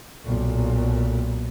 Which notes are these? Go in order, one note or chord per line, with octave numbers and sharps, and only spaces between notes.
B1 A#2